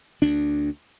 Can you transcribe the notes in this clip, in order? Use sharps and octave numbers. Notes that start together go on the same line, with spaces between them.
D2 D4